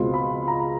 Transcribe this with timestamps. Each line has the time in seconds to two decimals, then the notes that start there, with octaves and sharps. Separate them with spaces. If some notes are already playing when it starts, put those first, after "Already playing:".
Already playing: C#2 B2 G#3 C4 F4 C6
0.14 B5
0.48 A#5